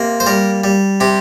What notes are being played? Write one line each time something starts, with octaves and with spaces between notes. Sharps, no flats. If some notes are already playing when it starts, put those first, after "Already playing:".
Already playing: C3 A#3
C5
G3 A#4
G3
C3 G4